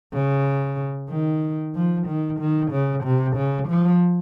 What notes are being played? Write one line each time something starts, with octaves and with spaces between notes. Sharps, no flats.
C#3
D#3
F3
D#3
D#3
C#3
C3
C#3
F3